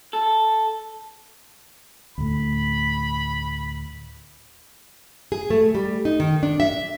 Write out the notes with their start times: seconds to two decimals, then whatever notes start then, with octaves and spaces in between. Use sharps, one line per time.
0.13 A4
2.18 D2 A2 B5
5.32 G#4
5.50 A3
5.75 G3
6.05 D#4
6.20 D#3
6.43 D4
6.60 E5